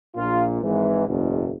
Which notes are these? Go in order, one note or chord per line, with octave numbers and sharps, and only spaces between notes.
A#1 A#2 F4
G#1 G#2 E3
F#1 E2 B2